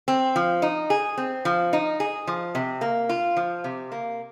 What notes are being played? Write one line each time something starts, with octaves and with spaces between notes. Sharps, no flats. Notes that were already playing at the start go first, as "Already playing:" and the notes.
C4
F3
D#4
G#4
C4
F3
D#4
G#4
F3
C3
A#3
F4
F3
C3
A#3